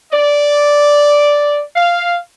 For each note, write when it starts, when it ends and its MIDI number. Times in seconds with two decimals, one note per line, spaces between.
0.12 1.60 74
1.75 2.17 77